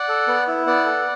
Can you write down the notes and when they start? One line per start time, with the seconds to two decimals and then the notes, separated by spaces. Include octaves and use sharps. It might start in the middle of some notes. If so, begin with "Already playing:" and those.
Already playing: D5 F#5
0.09 A4
0.28 B3
0.48 E4
0.66 B3 D5 F#5
0.85 A4